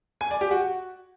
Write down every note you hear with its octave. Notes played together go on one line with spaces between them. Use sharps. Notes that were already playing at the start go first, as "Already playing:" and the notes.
G#5
D5
G4
F#4